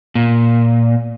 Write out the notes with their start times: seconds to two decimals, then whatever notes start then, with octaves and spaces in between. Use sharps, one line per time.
0.15 A#2